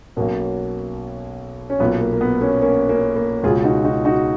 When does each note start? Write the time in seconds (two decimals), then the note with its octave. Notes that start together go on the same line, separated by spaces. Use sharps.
0.16 B1 B2 A#3 C#4
1.70 C#4
1.80 B1 A#2 B3
2.00 A#3
2.14 A#3
2.21 B3
2.41 A#3 C#4
2.61 A#3 C#4
2.89 A#3 C#4
3.16 A#3
3.43 C#2 B2 F4 G#4
3.64 D#4 F#4
3.84 D#4 F#4
4.05 D#4 F#4